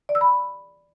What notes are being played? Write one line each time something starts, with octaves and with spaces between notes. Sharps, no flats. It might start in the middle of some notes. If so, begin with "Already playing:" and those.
D5
E6
B5